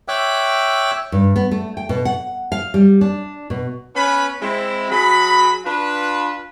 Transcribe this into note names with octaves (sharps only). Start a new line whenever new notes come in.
C#5 E5 G5 D6 E6 F#6
G2
B3
A3
G5
B2
F#5
F5
G3
D4
B2
B3 C#4 B4 B5
G#3 C4 E4
F#3 G#4 B5
D4 F4 B4